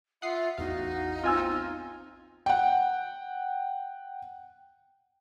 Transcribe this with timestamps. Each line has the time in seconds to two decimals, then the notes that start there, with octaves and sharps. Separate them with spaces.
0.22 F4 E5 F#5 D#6 C7
0.58 A1 E2 D#4 F#4 F5
1.24 C4 F4 G#5 E6
2.46 F#5 G5